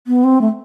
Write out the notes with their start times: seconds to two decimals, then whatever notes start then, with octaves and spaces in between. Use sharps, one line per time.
0.07 B3
0.24 C4
0.41 A3